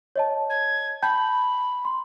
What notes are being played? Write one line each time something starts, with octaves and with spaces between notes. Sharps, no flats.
C#5 D#5 A5
G#6
G5 A5 B5 G6
C6